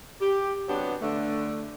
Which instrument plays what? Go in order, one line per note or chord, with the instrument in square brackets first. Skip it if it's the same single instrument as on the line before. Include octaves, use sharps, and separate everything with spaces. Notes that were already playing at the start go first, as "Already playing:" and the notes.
[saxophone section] G4
C3 F#3 B3 D4 G4
D3 A3